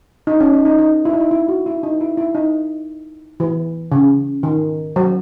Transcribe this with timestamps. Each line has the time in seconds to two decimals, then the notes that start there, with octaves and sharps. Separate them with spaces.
0.27 D#4
0.40 C#4
0.53 D#4
0.65 D#4
0.79 D#4
1.05 E4
1.13 D#4
1.20 E4
1.31 E4
1.49 F#4
1.66 E4
1.83 D#4
2.01 E4
2.17 E4
2.35 D#4
3.40 E3
3.92 C#3
4.43 D#3
4.96 F#3